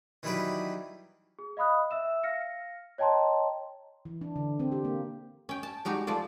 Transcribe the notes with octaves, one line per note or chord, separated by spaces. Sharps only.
D#3 E3 F#3 G3 G4 B4
G#4
D#5 F5 B5 D#6 F#6
E5 E6 E7
F5 F6 A#6 C#7
C#5 D#5 G5 A5 A#5 C6
E3
D4
D3
C4
G4
A#3
C#4 G5
A5
G3 G#3 D#4 F#4 G4
F3 A3 F4 D5